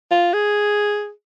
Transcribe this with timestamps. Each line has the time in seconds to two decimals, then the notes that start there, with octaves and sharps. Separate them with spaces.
0.11 F4
0.33 G#4